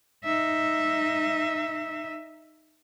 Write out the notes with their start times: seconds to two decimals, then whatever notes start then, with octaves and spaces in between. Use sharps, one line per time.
0.25 D#4 E5